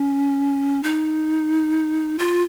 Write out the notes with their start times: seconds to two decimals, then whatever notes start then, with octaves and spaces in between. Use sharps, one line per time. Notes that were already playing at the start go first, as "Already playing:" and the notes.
Already playing: C#4
0.83 D#4
2.19 F4